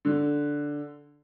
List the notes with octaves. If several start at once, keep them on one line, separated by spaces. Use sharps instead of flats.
D3